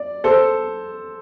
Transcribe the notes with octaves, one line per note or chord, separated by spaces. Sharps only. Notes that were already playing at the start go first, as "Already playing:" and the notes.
Already playing: D5
A4 C5